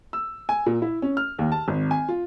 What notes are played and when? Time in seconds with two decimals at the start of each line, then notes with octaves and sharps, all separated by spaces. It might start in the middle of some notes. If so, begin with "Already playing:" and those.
0.13 E6
0.49 G#5
0.66 A#2
0.82 E4
1.02 C#4
1.17 F6
1.39 D#2
1.52 A5
1.68 G#1
1.91 G#5
2.08 F4